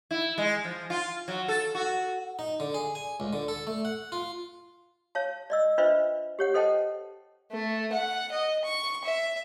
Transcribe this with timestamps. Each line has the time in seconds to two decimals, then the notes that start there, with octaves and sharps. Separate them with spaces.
0.11 E4
0.38 G#3
0.64 F3
0.90 F4
1.28 F#3
1.48 A4
1.75 F#4
2.39 D#4
2.60 D3
2.74 G#4
2.95 G#5
3.20 C#2
3.33 D3
3.48 A4
3.67 A3
3.85 F#5
4.12 F4
5.15 C#5 F5 A5
5.50 D5 D#5 E6
5.78 D4 F4 B4 C5 D#5 E5
6.39 G4 C#5 F#5
6.54 A4 C5 D#5 F#5 G5 A5
7.51 A3
7.92 F#5
8.32 D#5
8.64 C#6
9.04 E5